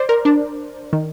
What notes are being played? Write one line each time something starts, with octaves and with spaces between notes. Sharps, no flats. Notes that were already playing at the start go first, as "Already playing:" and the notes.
Already playing: C5 D5
A#4
D4
D#3